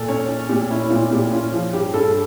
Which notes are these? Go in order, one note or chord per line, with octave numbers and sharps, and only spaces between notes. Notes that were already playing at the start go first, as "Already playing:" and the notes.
Already playing: A#2 A4
C#4 C#5
C#4
A#2 G4
C#4 E4
A#2 F4
A#2 G4
C#4 F4
F3
G2 G4
G2 A4